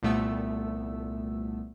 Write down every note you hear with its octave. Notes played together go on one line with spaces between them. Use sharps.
C2 A#2 A3 B3 E6